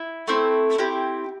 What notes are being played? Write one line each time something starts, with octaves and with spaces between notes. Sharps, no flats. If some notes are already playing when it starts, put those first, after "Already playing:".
Already playing: E4
A3 C4 E4
C4 E4 G4